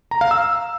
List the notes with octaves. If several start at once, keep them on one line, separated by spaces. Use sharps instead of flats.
A#5
F5
E6